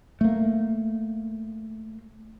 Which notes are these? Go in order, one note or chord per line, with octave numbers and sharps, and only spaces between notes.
A3 A#3